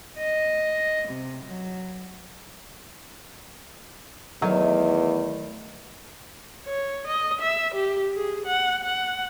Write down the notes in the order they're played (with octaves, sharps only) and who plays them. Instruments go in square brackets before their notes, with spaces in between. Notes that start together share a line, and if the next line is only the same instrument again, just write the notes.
[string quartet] D#5
C3
F#3
[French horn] E2 [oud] D#3 A3 D#4 [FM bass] F#3
[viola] C#5
D#5
E5
G4
G#4
F#5
F#5